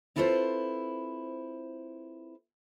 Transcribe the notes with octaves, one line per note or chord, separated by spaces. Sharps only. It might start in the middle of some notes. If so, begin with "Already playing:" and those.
C4 E4 F4 A4 B4 C5